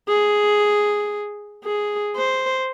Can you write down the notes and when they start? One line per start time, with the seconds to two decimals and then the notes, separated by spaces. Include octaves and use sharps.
0.08 G#4
1.65 G#4
2.16 C5